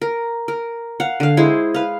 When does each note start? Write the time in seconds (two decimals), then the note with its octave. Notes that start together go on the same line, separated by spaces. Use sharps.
0.02 A#4
0.48 A#4
1.00 F5 F#5
1.20 D3 F5
1.37 G#3 E4 G#4 C5
1.74 B4 F5